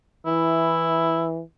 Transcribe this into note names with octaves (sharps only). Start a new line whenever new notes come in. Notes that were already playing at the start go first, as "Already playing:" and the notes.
E3 E4